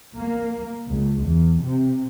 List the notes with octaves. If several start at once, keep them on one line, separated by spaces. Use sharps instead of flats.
A#3
C#2
E2
C3